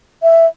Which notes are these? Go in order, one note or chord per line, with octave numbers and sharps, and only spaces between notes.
E5